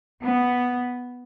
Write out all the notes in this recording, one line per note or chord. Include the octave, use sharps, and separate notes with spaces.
B3